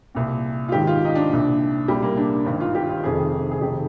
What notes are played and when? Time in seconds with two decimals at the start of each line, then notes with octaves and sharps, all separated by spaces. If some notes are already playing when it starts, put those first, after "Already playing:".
0.15 C2 A#2
0.68 F4
0.72 G#1 G#2 D#3 G4
0.87 F4
1.05 D#4
1.15 D4
1.30 C2 A#2
1.88 C2 A#2 G3
2.02 A#3
2.17 D4
2.45 G#1 G2 D#3
2.60 F4
2.75 G4
2.89 F4
3.03 F1 F2 C3 D#3 G#4
3.51 G#4
3.61 F1 F2 D#3 G4